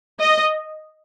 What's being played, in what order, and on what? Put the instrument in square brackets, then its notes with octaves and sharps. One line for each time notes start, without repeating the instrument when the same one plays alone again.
[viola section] D#5